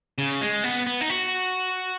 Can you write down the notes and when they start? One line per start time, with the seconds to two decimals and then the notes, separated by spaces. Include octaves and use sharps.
0.18 C#3
0.41 G#3
0.64 B3
0.87 B3
1.01 D#4
1.10 F#4